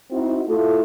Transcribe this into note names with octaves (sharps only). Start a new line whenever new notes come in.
C4 D#4 E4 F#4
A3 E4 F4 A4